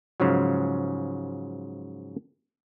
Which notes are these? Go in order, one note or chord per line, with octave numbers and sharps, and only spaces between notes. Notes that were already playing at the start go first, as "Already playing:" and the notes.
G#2 C#3 F3 F#3